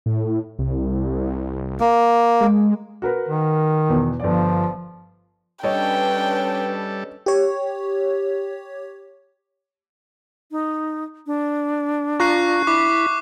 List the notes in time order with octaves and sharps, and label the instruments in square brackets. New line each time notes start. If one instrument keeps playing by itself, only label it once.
[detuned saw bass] A2
C2
[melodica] A#3
[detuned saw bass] G#3
[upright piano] F#4 A#4 B4
[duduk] D#3
[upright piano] E2 B2
[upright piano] G1 D5 [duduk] F3
[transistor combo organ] G3 A4 [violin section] C#4 D4 B4 [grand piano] C#5 D#5 [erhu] G5
[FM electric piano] G4 C#5
[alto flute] D#4
D4
[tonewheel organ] F4 A#5 [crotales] C#6 F#6 C7
[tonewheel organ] E4 B5 [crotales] D6